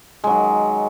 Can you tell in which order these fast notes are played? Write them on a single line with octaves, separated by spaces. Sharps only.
G#3 F#3 D#3